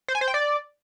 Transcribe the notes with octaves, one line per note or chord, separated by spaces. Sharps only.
C5
G#5
C5
G5
D5